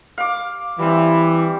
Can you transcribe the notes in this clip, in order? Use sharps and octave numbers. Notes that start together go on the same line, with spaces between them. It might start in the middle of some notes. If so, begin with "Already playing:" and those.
F5 D6
E3 G3 C4